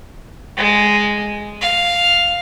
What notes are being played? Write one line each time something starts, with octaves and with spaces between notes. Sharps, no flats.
G#3
F5